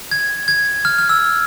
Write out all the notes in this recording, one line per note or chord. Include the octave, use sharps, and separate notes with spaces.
G#6
G#6
F6
F6
E6